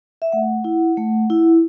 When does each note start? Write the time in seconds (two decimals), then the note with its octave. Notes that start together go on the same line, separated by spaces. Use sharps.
0.22 E5
0.32 A3 F#5
0.64 E4
0.97 A3
1.30 E4